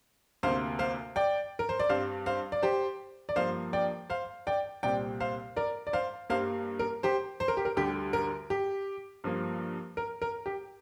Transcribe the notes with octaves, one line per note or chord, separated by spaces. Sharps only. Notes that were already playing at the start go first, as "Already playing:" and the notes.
D2 C3 A#3 C5 F5
C5 F5
D5 G5
A#4
C5
D5
G2 G3 C4 C5 F5
C5 F5
D5
G4 C5
D5
G2 F3 A#3 C5 F5
D5 G5
C5 F5
D5 G5
C2 A#2 G3 C4 D5 G5
C5 F5
A#4 D5
D5
C5 F5
G2 G3 A#3 C5 F5
A#4
G4 C5
C5
A#4
G4
A#4
D2 D3 G3 G4
A#4
G4
G2 F3 A#3
A#4
A#4
G4